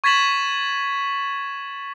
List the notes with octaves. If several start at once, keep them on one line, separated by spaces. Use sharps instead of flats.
C#6 G#6 A6 B6 E7 F#7